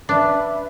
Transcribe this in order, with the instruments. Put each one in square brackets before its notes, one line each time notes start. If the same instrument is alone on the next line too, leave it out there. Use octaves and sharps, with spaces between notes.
[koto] D4 [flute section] B4 E5 B5